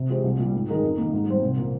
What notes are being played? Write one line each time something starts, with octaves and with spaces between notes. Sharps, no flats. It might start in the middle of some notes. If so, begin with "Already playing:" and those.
Already playing: C3
F3 G#3 C4 G4
C2
A#2 G3
G#2
D#3 G#3 D#4 A#4
F2
D#3 A#3
G#2
G3 C4
C2
A#2 F3 A#3